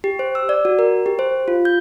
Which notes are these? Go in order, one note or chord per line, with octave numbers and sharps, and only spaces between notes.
G4
C5
E6
D5
F#4
A#4
G4
C5
F4
G6